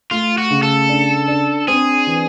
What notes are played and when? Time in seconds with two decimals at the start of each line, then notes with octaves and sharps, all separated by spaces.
0.11 A3 F4
0.38 F#4
0.50 C#3
0.63 A4
0.89 D4
1.28 D4
1.68 C4 G#4
2.07 E3